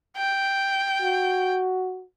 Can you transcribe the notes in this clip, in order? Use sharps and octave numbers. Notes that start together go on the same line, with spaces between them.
G5
F#4